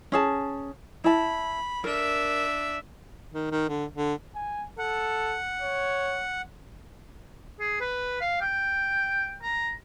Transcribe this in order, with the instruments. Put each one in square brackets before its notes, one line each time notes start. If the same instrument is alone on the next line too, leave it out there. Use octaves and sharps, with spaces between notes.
[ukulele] C#4 G#4 A5
[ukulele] E4 A5 [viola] B5
[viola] D4 E5 [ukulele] A#4
[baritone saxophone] D#3
D#3
D3
D3
[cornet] G#5
[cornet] A4 [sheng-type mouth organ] F#5
[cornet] C#5
[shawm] G#4
B4
F5
G5
A#5